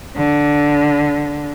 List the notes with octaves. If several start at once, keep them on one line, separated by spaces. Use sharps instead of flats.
D3